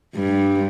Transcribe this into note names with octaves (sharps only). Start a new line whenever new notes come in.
G2